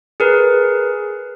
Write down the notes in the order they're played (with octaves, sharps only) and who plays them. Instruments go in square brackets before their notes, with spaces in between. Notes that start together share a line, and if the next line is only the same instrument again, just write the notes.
[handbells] G#4 A#4 B4